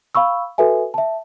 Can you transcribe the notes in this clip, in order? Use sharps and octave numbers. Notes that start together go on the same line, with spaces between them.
F5 B5 C#6 E6
F#4 A4 B4 E5 G#5
E5 A5